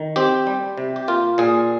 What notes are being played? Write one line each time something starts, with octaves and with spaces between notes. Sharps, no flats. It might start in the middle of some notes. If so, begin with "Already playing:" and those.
Already playing: D#3
C4 G4
G3
C3
G4
A#3 F4
A#2 G#4